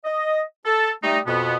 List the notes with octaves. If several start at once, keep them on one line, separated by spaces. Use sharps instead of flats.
D#5
A4
G3 A3 D#4
F2 B2 B3